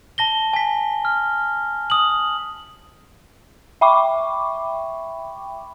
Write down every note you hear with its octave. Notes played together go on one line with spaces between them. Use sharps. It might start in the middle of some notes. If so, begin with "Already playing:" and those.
A5 A#6 G7
G#5 B6
F6
D#6 F#7
E5 G5 B5 C#6 D6